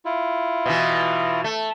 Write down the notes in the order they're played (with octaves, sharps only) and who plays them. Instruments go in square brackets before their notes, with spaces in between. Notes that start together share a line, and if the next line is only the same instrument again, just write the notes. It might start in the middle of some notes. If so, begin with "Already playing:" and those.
[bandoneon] E4 F4
[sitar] B2 E3
A3